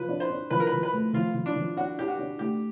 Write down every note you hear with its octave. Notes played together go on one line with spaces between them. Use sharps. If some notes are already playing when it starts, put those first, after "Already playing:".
Already playing: F3 B4
D4
C5
D4
F3 B4
A#4
B4
F3
B4
A3
F3 F4
F3
D4
F3
D4 F#4
D4 G4
F#4
D4
A3 G4